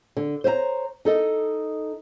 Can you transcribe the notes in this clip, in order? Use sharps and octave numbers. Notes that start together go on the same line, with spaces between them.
D3
C5 C#5 E5 A#5
D#4 A4 D#5